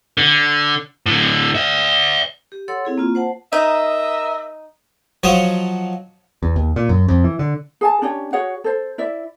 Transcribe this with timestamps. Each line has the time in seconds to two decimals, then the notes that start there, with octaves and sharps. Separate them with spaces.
0.18 D3
1.06 A2 D3
1.55 D5 E5
2.52 G4
2.68 A4 C#5 F#5 C6 E6
2.85 C4 E4 G#4
2.98 A#3 F4
3.15 C5 F#5 A5
3.53 D#4 A#4 D#5 E5
5.23 F3 F#3 C5 C#5 D#5
6.43 E2
6.56 D#2
6.76 A#2
6.89 F#2
7.08 F2
7.24 E3
7.39 D3
7.81 G#4 G#5 A5
8.02 C#4 D4 G4 C#5
8.33 F#4 G#4 C#5 F#5
8.64 A4 C5
8.98 E4 D5 E5